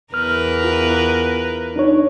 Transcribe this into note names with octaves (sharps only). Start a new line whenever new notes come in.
E2 A#4 B4 F6
F4
D4 D#4 C#5